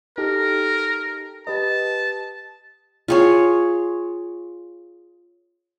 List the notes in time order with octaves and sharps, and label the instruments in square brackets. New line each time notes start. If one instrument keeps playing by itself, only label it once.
[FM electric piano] D#4 G4 A4 [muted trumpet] A#4
[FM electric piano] G4 B4 D#5 [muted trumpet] A5
[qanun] F4 G#4 C#5